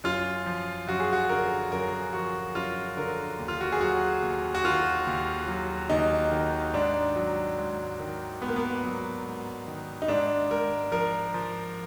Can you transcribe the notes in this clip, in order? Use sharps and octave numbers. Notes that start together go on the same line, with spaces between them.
F#2 F4
F3
F#2 F#4
G#4
F#4
D3 A#4
F#2 A#4
F3 F#4
F#2 F4
D3 A#4
D#2
F4
F#4
G#4
F#3 F#4
D#2
F#4
D#3 F4
D#2
F#3
D#2 D#4
D#3
G#2 D4
F#3
G#2
D#3
G#2 B3
A#3
B3
F#3
G#2
D#3
D#4
G#2 D4
G#2 A#4
F3 A#4
F3